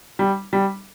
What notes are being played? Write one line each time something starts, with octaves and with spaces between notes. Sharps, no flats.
G3
G3